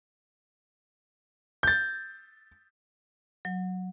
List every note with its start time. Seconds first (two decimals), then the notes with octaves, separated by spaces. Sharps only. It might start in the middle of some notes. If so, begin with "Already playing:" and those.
1.63 G6 A6
3.45 F#3